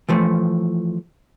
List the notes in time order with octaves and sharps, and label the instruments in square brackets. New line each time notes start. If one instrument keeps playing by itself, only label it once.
[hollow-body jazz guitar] E3 F3 A3